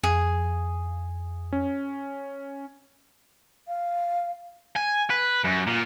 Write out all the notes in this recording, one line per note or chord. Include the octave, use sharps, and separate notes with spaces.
F2 G#4
C#4
F5
G#5
B4
F#2
A#2